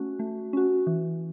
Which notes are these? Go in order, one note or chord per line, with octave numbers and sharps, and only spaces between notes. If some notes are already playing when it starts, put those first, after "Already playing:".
Already playing: A3 C#4 F#4
A3
C#4 F#4
E3